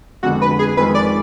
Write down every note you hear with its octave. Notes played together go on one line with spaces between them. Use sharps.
F2 D3 G#3 B3 F#4
B4
G#4
F2 D#3 G#3 B4
D5